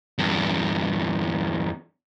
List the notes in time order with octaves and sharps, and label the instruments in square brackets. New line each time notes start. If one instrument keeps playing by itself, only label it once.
[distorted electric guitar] E2 G2